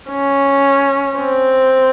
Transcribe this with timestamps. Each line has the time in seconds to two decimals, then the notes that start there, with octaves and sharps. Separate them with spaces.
0.11 C#4
1.17 C4